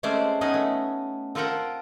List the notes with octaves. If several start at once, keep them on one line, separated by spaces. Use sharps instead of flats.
G#3 A3 C4 C#4 C5 D5
B3 C#4 D#4 G#4 D#5
A3
C4 F4 A4 A#4 F#5 G5